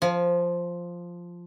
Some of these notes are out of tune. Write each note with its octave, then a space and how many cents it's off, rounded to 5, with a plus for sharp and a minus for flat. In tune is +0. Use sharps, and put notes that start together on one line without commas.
F3 +0 G#5 +35